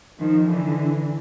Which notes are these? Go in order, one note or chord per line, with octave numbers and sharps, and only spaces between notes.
D#3 F3
D3 E3